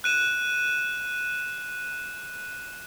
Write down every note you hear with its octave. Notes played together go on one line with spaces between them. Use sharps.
F#6 D#7 E7